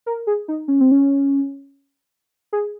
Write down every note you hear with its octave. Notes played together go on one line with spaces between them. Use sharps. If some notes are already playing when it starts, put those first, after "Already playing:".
A#4
G#4
D#4
C#4
C4
C#4
G#4